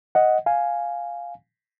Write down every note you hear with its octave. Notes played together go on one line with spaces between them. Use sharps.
D#5 F#5
F5 G#5